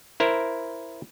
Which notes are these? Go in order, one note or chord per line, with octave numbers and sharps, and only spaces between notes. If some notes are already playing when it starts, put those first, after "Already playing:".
E4 A#4 C5